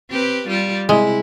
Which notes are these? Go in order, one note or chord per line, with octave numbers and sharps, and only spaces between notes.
C4 G4 B4
G3 F4 G4
C3 G#3 E4